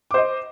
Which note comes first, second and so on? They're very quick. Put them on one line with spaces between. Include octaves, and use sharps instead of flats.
D6 C5 D#5